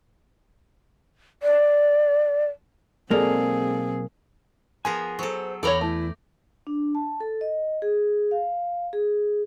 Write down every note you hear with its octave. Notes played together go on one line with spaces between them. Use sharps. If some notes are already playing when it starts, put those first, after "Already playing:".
D5
B1 G#3 A#3 C4 G#4 A4 D5
F3 B3 G#4 A#4 G#5
F#3 A4 C5
E2 A4 A#4 C#5 D5 G5 A#5 B5
A3 E4
D4
A5
A4
D#5
G#4
F5
G#4